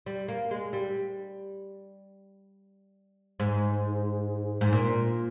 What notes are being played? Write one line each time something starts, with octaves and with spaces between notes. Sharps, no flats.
G3
A#3
G#3
G3
G#2
G#2
A#2